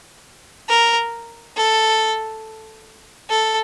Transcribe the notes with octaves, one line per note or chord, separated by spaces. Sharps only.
A#4
A4
A4